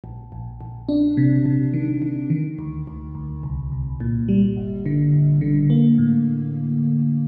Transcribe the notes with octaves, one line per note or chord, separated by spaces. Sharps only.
A#1
A#1
A#1
D4
C3
C3
D#3
D#3
D#3
D2
D2
D2
C2
C2
A#2
G3
G1
D3
G1
D3
A#3
A2